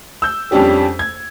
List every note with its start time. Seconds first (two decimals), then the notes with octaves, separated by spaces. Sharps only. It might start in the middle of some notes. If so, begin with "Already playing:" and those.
0.22 E6 G6
0.51 F2 G3 C#4 D4 G4 G#4
0.99 G#6